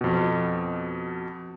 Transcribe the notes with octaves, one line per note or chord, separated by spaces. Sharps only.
F2 B2